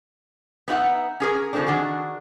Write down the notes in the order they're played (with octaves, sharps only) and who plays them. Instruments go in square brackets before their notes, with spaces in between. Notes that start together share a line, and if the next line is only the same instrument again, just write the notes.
[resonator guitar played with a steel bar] B3 D#4 F4 E5 F#5
C#4 G#4 A#4
C#3 F3 G#3 A3 C4 D4
D#3 D4 F#4 G#4